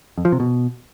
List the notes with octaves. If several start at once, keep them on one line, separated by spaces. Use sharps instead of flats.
F2
F3
C3
B2